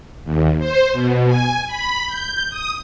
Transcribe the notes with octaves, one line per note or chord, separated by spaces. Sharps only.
D#2
C5
B2
G#5
B5
G6
D#6